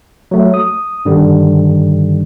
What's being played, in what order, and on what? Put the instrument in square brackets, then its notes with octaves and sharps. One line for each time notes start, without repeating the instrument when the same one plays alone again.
[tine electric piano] F#3 A3
D#6
G2 D3 D#3 G3